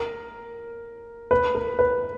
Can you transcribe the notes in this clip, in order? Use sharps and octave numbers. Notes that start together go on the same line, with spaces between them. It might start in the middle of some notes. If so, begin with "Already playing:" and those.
Already playing: A#4
B4
A#4
B4